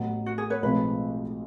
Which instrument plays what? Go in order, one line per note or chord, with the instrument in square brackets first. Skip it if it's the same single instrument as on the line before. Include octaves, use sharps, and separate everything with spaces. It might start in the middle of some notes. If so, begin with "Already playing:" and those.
Already playing: [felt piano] A1 A2 F#3 B3
[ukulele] F#4
G#4
B4 C#5
[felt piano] B1 A2 F3 G#3 C4 [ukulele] B4